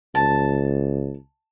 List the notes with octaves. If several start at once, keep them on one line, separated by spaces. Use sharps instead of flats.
C#2 A5